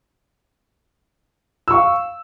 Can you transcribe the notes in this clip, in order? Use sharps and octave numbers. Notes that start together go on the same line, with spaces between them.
F5 C#6 E6